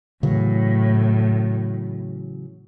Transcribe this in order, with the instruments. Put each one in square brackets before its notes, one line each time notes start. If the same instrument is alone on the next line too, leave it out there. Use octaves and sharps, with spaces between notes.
[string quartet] A2 [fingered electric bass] C#3 E3 F#3